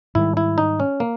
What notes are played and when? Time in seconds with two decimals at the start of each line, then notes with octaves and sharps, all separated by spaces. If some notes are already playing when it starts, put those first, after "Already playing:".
0.15 G#2 D#3 G3 E4
0.37 E4
0.58 D#4
0.80 C#4
1.00 A#3